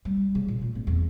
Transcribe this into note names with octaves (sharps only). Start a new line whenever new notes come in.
G3
C#3
A#2
A3
G#1
E2